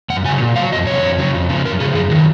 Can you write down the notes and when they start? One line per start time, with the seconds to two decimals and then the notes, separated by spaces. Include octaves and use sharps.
0.10 F#2 F#5
0.25 C#3 G#5
0.29 F#3
0.40 A#2
0.56 F#3 F5
0.72 F2 D#5
0.87 C3 F#3 C#5
1.02 F2
1.18 C#3 F#3
1.34 F2
1.49 C#3 F3
1.65 F#2 A#4
1.80 C#3 F3 G#4
1.95 F#2 G#4
2.11 D#3 F#4
2.14 F#3